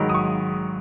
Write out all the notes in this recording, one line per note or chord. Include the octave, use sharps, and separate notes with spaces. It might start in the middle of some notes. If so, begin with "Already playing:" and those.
Already playing: G#2 D#3 F#3 B5
D#6
C#6